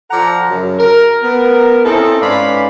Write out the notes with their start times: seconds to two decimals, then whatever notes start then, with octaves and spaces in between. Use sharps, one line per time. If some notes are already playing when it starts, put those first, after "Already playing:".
0.11 F3 A4 D5 F#5 A#5
0.49 F#2 C#3
0.79 A#4
1.23 B3 A#4
1.85 C4 C#4 D#4 E4 A4
2.21 G#2 C#4 B4 D5 F5 B5